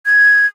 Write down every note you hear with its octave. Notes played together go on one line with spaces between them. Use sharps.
G#6